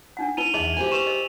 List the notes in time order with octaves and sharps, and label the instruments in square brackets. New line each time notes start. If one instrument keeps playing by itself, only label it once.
[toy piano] D4 D#4 F#5
[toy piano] D#4 E4 B4 [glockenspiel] D#7 F7 G7
[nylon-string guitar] E2 E5 [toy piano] G#4 D#5 A5 [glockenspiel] F#7
[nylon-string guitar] G4 C5 G#5
[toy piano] B4 C#6 [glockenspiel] E7 F7
[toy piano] A#4 D#5